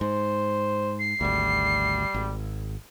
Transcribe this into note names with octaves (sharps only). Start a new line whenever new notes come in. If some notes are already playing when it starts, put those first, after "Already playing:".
G#2 C5
C7
G#1 D2 G3
G#1